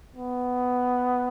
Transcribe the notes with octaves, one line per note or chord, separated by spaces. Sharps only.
B3